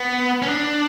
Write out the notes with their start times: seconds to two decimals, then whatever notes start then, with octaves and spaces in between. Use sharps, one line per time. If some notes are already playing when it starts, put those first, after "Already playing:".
Already playing: B3
0.42 C#4
0.47 D4